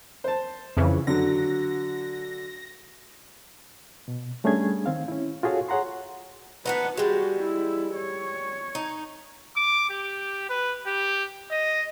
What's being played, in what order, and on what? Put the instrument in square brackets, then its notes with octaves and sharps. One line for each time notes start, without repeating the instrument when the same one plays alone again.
[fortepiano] C5 A5
[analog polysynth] F2 C#3 E3
[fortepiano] D3 F#3 [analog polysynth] A#6
[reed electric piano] B2
G3 A3 C#4 D4 G#4 G#6
D#3 C4 F5
C#4 E4
F4 F#4 G#4 A4 C#5 F5
G#4 C#5 F#5 A#5 C6
[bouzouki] B3 D4 D#4 [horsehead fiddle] B4 F#5
[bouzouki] G3 G#3 [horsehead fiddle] F#4 G4
[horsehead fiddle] E4
C#5
[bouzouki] D#4
[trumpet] D6
G4
B4
G4
D#5